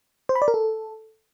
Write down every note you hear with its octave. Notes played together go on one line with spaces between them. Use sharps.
C5
B5
D5
A#4
A4